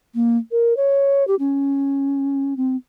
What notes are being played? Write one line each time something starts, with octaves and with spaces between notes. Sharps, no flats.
A#3
A#4
C#5
G4
C#4
C4